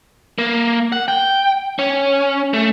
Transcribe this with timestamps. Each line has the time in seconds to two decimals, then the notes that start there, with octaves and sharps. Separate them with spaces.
0.38 A#3
0.92 F#5
1.08 G5
1.79 C#4
2.54 A3